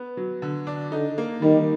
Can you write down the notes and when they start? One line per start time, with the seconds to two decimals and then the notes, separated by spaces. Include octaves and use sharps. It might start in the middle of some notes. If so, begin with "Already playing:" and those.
Already playing: B3
0.17 F#3
0.42 D3
0.67 D4
0.92 D3 D#4
1.18 A#3
1.42 D#3 G3